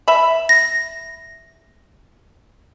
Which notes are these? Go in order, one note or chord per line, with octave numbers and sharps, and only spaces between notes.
E5 B5
A#6